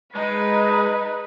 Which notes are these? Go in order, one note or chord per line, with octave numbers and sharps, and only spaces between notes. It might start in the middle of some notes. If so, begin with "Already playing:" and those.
G#3 D#4 B4